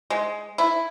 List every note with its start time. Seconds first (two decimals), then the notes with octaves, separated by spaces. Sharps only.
0.10 G#3
0.58 E4